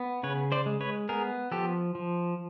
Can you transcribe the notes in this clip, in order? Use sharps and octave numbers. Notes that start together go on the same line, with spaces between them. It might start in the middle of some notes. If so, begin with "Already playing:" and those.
Already playing: B3
C#3 B4 C#5
C5 D5
G#3
B4 C#5
B3 G#4 A#4
F3 G4 A4
F3